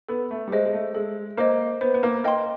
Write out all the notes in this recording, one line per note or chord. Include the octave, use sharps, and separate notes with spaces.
B3 A4
A3
G3
G#3 C5 D#5
G#3
A3
G#3 A4
A#3 C5 D#5
B3 C5
B3
A#3
A#3 D#5 G5 C6